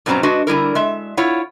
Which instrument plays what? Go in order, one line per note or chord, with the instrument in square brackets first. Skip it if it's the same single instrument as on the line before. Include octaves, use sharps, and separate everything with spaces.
[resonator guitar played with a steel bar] G2 B2 F#3 C4 C#4 A#5
G#3 D4 F#4 B4 D#5
D3 G3 E4 A#4
G#3 E5
E4 F4 C#5 F#5